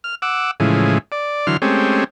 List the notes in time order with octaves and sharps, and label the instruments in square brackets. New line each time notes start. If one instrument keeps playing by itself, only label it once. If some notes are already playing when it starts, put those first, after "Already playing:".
[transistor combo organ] F6
F#5 D6 E6
A2 C#3 E3 F3 G#3
D5
D3 E3 F#3 C6 F6
G#3 A3 C4 C#4 G4